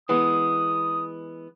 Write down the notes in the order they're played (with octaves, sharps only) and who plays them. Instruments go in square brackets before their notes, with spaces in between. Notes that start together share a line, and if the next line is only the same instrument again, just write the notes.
[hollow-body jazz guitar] E3 G#3 B3 [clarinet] D#6